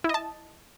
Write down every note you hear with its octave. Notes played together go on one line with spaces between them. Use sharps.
E4 D#5 A5